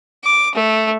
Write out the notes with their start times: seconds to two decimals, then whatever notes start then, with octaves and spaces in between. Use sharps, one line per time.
0.24 D6
0.55 A3